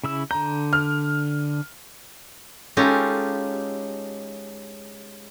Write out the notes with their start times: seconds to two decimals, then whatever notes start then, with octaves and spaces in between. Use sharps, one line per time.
0.04 C#3 E4 E6
0.31 D3 A#5 G6
0.73 F6
2.77 G#3 C#4 D#4 F4 G4 A4